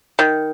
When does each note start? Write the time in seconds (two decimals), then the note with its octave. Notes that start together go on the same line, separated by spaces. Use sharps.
0.19 D#3